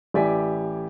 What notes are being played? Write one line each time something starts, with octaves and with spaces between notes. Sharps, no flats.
A1 E4 G4 D5 G#5 B6